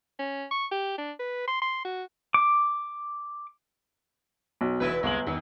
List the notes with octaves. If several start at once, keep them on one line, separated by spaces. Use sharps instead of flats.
C#4
C#6
G4
D4
B4
C6
C6
F#4
D6
B1
F1 E2 E4 B4
G1 C2 G#3 A#3 F#7
E2 B2 D#3